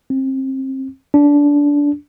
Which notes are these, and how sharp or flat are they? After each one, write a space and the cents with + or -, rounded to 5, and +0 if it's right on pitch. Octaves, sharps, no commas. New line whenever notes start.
C4 +25
D4 -20